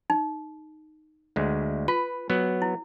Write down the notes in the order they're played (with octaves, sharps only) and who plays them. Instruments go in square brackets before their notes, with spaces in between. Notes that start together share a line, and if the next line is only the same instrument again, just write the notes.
[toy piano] D#4
[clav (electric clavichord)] D2 G#3
[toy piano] F4 [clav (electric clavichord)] B4
[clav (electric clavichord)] F#3 B3
[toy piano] E4